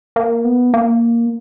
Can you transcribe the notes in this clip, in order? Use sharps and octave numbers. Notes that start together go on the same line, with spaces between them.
A#3
B3
A#3